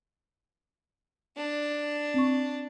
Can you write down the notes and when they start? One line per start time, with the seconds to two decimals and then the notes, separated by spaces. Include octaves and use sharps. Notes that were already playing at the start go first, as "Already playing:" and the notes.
1.37 D4
2.14 C4 C#6